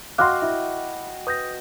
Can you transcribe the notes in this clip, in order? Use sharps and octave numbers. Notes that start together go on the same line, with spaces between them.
F#4 D#5 F5 G5 C6 D6 F6 F#6
E4
B4 D#6 G6 A#6